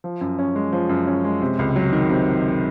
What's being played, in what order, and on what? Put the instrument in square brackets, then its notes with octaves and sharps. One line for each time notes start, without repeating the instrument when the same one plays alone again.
[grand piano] F3
F#2
C#4
G#3
F3
F#2
C#4
G#3
C3
C#2
F#3
D#3
C3